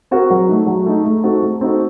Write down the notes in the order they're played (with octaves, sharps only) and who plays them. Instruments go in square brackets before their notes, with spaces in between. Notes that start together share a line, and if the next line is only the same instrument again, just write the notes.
[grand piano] C4 F#4 A#4
F#3
A3 D#4
F#3
A3 D#4
A3
C4 D#4 F#4 A4
A3
C4 D#4 F#4 A4